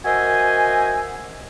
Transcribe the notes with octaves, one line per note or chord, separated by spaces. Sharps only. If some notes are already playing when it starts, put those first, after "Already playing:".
F#4 A#4 C5 D#5 E5 G#5